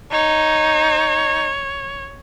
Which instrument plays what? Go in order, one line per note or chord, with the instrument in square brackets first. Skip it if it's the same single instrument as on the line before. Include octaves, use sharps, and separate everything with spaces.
[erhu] D#4 [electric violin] C#5